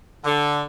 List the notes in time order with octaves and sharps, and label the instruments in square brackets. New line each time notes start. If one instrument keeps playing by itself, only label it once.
[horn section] D3